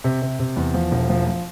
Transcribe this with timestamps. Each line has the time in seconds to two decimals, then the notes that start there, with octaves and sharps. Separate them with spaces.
0.04 C3
0.22 C3
0.39 C3
0.56 E2
0.74 F3
0.92 E1
1.09 F3
1.27 F3